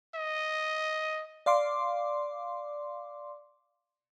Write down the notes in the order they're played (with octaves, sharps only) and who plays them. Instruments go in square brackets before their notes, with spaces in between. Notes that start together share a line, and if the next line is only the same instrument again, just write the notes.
[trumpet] D#5
[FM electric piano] D5 F5 C6 D6